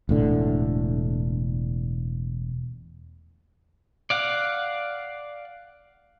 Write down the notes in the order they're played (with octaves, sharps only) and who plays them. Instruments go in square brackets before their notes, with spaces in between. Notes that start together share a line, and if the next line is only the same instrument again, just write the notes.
[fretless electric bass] E1 A2 D3
[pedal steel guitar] D5 F5 F#5